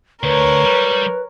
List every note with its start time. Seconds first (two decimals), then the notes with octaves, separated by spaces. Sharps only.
0.23 D2 A#4 B4 C#5
0.65 G3